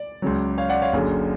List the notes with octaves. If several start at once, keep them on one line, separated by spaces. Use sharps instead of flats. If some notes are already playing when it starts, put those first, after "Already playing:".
Already playing: D5
C#2 C#3 F#3
C#5 F5
D5 F#5
C#5 F5
F#1 F#2 D3